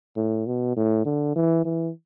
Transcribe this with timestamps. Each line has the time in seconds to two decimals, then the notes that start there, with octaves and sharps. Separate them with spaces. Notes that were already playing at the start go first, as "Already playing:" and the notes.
0.16 A2
0.47 B2
0.76 A2
1.05 D3
1.36 E3
1.65 E3